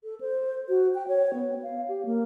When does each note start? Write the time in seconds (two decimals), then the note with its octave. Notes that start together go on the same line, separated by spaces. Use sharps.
0.04 A4
0.21 C5
0.69 F#4
0.95 G5
1.08 C#5
1.34 B3
1.63 F5
1.88 G4
2.05 A#3